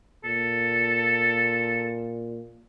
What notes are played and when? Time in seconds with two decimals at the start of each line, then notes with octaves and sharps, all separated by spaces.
0.24 A#2 A4